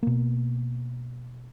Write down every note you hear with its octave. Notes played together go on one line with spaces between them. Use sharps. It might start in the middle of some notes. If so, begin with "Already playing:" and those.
B2 A#3